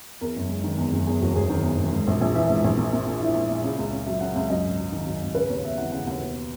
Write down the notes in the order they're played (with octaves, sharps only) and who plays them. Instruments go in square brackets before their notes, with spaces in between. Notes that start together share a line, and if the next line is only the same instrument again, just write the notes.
[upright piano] E2 A#4
F#1
G#3
D#3
E2
F#1
E2 G#4
E1 F#4
E1 G#4
D#3
E2
E1
G#2
A#1
A#1
E3 E5
G#2
A#1
A#3
A#2
A#2
E4
A#3
A#2
C#3
C#2
C#4
F#3 E5
C#3 F#5
C#2 E5
F#2 D#5
G#1
F#3
D#3
F#2
G#1
C#3 B4
D#2 C#5
B3 E5
E3 F#5
C#3 F#5
D#2 F#5
B2